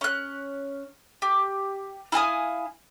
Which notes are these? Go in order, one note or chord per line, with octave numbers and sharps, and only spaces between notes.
C#4 F#6
G4
E4 F5 G#5 D#6